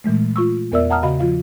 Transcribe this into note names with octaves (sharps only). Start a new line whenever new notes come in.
A#2 E3 G#3 A3
F4 C#6 E6
E2 B3 A#4 D5 E5 E6
E5 F#5 A5 A#5 D#6 F6
C#3 F#4 D#5 F5 B5
F3 F4 F5